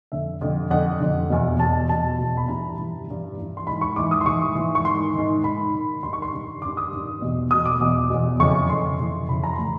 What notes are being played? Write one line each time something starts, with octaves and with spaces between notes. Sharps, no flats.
F2 D3 E5
F2 D3
F2 D3 F#5
F2 D3
E2 B2
E2 B2 A5
E2 B2 A5
E2 B2
B5
G2 E3 A#5
G2 E3
G2 E3
G2 E3
C6
G#2 E3 B5
C#6
G#2 E3 D6
D#6
C6
G#2 E3 C#6
G#2 E3
C#6
G#2 D#3 C6
G#2 D#3
G#2 D#3 B5
G#2 D#3
G2 D#3 C6
C#6
C6
G2 D#3
G2 D#3 D6
D#6
G2 D#3
E2 B2
E2 B2 D#6
D6
E2 B2
E2 B2
F2 C#3 E3 C#6
F2 C#3 E3 C6
F2 C#3 E3
F2 C#3 E3 B5
A#5
C6
A2 E3 B5